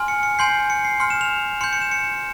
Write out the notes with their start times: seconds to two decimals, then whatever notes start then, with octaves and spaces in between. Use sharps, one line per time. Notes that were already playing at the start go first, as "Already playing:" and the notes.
Already playing: G#5 C6 F6
0.08 C#7
0.23 C#7
0.39 G#5 C6 G6 C7
0.70 C#7
0.85 C7
1.00 C6 F6 C#7
1.10 E7
1.21 F7
1.61 C6 G6 C#7
1.73 C#7
1.82 E7
1.91 C#7